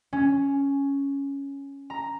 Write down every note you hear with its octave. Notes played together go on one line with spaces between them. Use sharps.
C#4
A#5